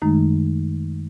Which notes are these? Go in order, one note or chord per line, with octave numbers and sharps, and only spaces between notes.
F#2 D#3 G#3 A3 D#4